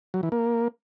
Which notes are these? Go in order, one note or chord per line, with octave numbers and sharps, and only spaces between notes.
F#3
E3
A#3